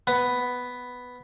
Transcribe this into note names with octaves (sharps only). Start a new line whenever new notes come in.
B3